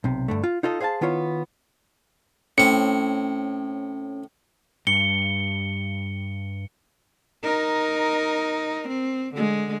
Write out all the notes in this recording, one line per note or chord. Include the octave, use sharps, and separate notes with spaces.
B1 C3
G2 D3 A3
F4
D#4 F4 A4 D#5
G#4 C5 F5 G#5 A5
D#3 B3 E4 F4 C#5
A2 C4 C#4 C#7
G2 C#7 G7
D#4 A#4
C4
D3 G#3